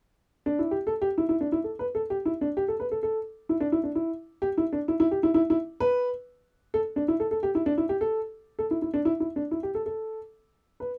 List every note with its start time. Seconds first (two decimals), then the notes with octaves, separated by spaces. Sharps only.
0.46 D4
0.59 E4
0.71 G4
0.87 A4
1.02 G4
1.18 E4
1.29 E4
1.41 D4
1.52 E4
1.64 A4
1.79 B4
1.95 A4
2.10 G4
2.25 E4
2.41 D4
2.57 G4
2.68 A4
2.80 B4
2.92 A4
3.03 A4
3.49 E4
3.60 D4
3.72 E4
3.84 D4
3.95 E4
4.42 G4
4.58 E4
4.73 D4
4.88 E4
5.00 E4
5.11 G4
5.23 E4
5.34 E4
5.50 E4
5.80 B4
6.74 A4
6.96 D4
7.08 E4
7.20 A4
7.31 A4
7.43 G4
7.55 E4
7.66 D4
7.78 E4
7.89 G4
8.01 A4
8.59 A4
8.71 E4
8.82 E4
8.94 D4
9.05 E4
9.20 E4
9.36 D4
9.51 E4
9.63 G4
9.75 A4
9.86 A4
10.80 B4